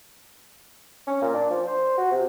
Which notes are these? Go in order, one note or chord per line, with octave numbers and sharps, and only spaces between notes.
C#4
A#2
D4
F3
C5
F#4
C3